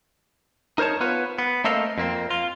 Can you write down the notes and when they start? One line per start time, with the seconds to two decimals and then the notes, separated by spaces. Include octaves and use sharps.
0.78 D#4 A#4 C5 C#5 A5
1.01 B3 F4 B4 C#5
1.39 B3
1.64 A3 A#3 C4 A4 D#5 F5
1.98 F2 A#3 C4
2.30 F4